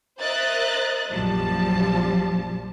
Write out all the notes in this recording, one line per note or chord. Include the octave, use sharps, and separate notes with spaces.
A#4 C5 D#5 E5 F#6 A6
A#1 F#2 F3 G3 A5